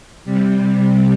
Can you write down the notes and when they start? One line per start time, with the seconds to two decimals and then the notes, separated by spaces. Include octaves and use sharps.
0.25 C3 G3